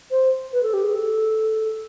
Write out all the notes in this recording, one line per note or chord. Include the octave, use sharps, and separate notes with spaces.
C5
B4
A4
G4
G#4
A4